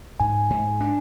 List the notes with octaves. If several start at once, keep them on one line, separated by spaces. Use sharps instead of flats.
G#2 G#5
G#2
D4